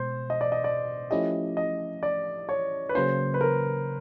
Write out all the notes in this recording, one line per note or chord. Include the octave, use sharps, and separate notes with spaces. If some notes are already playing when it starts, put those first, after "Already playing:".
Already playing: B2 G#3 B3 C5
D#5
D5
D#5
D5
F3 A3 C#4 E4 G4 D#5
D#5
D5
C#5
B4
C#3 F#3 A#3 C#4 C5
B4
A#4